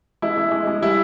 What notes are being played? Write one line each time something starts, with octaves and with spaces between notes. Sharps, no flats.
G#3 E4
G#3
G#3
G#3
G3 E4